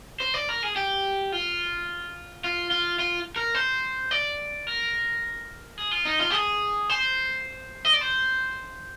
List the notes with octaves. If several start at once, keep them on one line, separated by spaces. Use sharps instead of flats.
C5
D5
A#4
G#4
G4
F4
F4
F4
F4
A#4
C5
D5
A#4
G#4
F4
D#4
F4
G4
G#4
C5
D#5
D5
C5